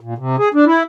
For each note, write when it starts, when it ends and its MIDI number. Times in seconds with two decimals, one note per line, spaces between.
0.01 0.14 46
0.18 0.36 48
0.38 0.49 68
0.54 0.65 62
0.66 0.83 64